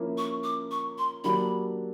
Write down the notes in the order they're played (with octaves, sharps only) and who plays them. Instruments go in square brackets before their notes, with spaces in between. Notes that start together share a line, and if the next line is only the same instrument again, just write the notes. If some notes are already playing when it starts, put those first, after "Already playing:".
Already playing: [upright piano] F3 A#3 C#4 E4
[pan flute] C#6
D6
C#6
C6
[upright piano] F#3 A#3 D4 G4 [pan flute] B5